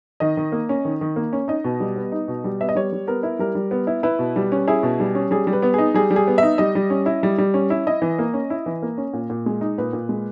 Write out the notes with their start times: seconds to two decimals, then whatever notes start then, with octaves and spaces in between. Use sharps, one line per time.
0.20 D#3 D#5
0.37 D#3
0.52 A#3
0.69 C#4
0.85 D#3
1.01 D#3
1.16 A#3
1.33 C#4
1.48 D#4 D#5
1.64 B2
1.80 G3
1.96 B3
2.12 D#4
2.28 B2
2.44 G3
2.61 B3 E5
2.69 D#5
2.75 G3 C#5
2.93 G3
3.07 B3 A#4
3.23 E4
3.39 G3 A#4
3.55 G3
3.71 B3
3.87 E4
4.03 E4 B4
4.19 B2
4.36 G3
4.52 C#4
4.68 E4 G#4
4.83 B2
5.00 G3
5.15 C#4
5.31 G3 G#4
5.47 G3
5.53 B4
5.62 B3
5.74 D#4 G#4
5.94 G3 G#4
6.11 G3
6.16 G#4
6.27 B3
6.38 D#4 E5
6.58 G3 D#5
6.75 G3
6.90 C#4
7.06 E4
7.23 G3
7.38 G3
7.54 C#4
7.70 E4
7.87 E4 D#5
8.02 E3
8.19 A#3
8.34 C#4
8.50 E4
8.66 E3
8.82 A#3
8.98 C#4
9.13 A#2
9.30 A#2
9.46 G#3
9.61 D#4
9.78 A#2 B4
9.93 A#2
10.09 G#3